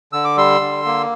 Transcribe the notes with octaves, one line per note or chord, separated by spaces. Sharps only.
D3 E6
D6
G3 C6 E6
D3
A#3